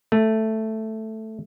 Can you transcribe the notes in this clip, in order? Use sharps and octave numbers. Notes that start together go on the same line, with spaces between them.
A3